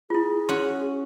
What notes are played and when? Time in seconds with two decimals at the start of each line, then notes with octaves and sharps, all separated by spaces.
0.10 E4 F4 G#4
0.49 C#4 F#4 C6